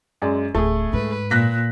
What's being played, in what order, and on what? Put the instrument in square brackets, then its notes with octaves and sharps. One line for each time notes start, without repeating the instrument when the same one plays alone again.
[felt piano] F#2 G#3 D5
[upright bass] D1 [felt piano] A3 G#4
[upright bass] G#2 [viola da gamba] B4
[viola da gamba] A#2 [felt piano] F#6 A#6 B6